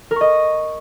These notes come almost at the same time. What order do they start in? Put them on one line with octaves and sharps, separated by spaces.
A#4 C#6 D#5